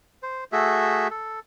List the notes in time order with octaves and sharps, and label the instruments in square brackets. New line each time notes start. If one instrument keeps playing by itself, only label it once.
[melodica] C5
A3 F#4 G#4 E5
A4